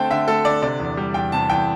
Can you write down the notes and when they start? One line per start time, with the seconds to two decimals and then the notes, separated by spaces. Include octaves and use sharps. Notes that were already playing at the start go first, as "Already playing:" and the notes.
Already playing: D3 A3 C4 G5 A5
0.10 D3 E5
0.28 A3 A4
0.45 D3 D5
0.62 C3 D5
0.80 E2
0.97 G3
1.14 E2 G5
1.32 C3 A5
1.50 E2 G5